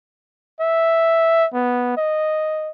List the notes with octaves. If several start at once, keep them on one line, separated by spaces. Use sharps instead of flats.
E5
B3
D#5